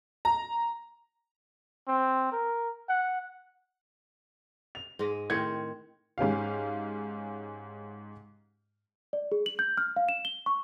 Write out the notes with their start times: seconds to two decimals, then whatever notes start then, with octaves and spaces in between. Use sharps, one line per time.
0.25 A#5
1.88 C4
2.32 A#4
2.89 F#5
4.75 F7
4.99 G#2 G#3
5.30 A2 D#3 C4 G#6 C#7
6.18 G#2 C#4 G4 F5
9.13 D5
9.32 G#4
9.46 F#7
9.59 G6
9.78 F6
9.96 F5
10.09 E7
10.25 G7
10.46 C#6